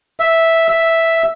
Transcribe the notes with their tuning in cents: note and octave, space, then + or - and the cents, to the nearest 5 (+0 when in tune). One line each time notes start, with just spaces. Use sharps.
E5 -5
E5 -5